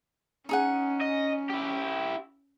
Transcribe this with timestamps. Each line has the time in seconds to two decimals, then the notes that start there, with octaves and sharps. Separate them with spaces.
0.49 C#4 D#4 G#4 F#5
1.01 D#5
1.49 E4 G4